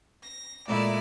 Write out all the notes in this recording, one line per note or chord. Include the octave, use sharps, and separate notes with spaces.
A#6
A#2 G#3 A3 E4 D5